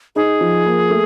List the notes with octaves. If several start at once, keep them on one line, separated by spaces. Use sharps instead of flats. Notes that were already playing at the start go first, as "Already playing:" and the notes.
D#4 G#4
F3
A#3
A3